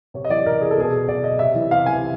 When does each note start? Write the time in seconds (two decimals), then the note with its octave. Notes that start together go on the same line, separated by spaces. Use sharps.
0.14 C3 C#5
0.25 D#5
0.30 E3 D5
0.46 C3 A#4
0.61 E3 G#4
0.71 A4
0.77 B2 G#4
1.08 B2 D5
1.24 D#5
1.39 C3 E5
1.55 E3
1.71 C3 F5
1.86 E3 G#5